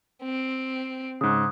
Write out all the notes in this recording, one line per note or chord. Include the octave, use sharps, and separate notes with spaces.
C4
G#2 C#3 D#6 F#6